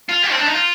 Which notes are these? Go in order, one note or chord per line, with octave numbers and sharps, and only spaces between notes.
F4
G4
C4
D4
D#4
F4